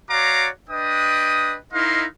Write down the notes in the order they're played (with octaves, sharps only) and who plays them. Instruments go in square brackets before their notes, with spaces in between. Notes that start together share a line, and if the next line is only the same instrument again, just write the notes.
[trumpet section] F#4 C#5 D5 F5 A#5 D6
D4 B4 D#5 G5 D#6
D#4 E4 A#4 D#5 F5 C6